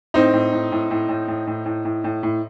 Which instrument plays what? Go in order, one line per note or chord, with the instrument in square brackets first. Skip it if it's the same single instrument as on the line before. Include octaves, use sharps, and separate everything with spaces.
[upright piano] A2 C4 D#4
A2
A2
A2
A2
A2
A2
A2
A2
A2
A2
A2